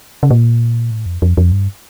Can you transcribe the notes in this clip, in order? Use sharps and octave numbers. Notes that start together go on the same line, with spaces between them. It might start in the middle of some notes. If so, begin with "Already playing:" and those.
C#3
A#2
A2
F2
F2
F2
G2